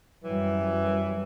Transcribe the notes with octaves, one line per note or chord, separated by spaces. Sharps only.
F#2 E3 F#3 G3